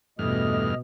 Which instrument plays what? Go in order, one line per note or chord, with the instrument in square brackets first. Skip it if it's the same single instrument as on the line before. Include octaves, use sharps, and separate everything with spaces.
[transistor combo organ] E2 G2 F6 [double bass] B2 [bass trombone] A3 [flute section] D#5 D#6